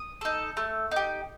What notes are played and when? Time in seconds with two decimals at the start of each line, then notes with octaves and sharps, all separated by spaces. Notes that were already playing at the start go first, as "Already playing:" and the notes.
Already playing: D#6
0.21 D#4 A4
0.57 A3
0.91 D#4 G4